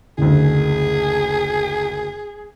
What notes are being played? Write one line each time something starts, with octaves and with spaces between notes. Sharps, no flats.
F#1 D2 G#4